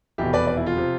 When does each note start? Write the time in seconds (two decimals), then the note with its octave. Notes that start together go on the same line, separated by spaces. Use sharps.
0.18 F1 E2 B2 E4 G4
0.33 B4 D5
0.47 B4 D5
0.57 E4
0.66 F4
0.77 C3 F3